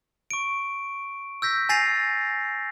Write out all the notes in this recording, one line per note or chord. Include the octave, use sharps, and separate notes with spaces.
C#6 D7
E6 G6 A#6 B6
G#5 A6 A#6 C7 D#7 F7